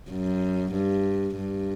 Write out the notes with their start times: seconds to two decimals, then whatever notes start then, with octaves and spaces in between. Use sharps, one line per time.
0.10 F#2
0.73 G2
1.35 G2